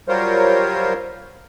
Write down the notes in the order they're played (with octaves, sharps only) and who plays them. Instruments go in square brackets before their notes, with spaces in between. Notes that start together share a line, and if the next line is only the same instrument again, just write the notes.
[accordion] F#3 G3 F4 A#4 C5 C#5